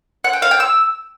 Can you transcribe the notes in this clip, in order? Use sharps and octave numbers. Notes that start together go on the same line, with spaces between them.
F#5
G5
F5
G5
E6